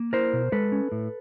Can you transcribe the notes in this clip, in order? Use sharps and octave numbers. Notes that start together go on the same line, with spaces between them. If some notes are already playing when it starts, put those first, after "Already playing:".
Already playing: A#3
E4 A#4 C5
B2
G#3 A4 B4
C#4
A2